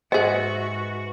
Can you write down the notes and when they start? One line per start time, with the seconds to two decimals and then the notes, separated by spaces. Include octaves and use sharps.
0.12 G#2 F#4 G#4 B4 C5 D#5 E5 F#5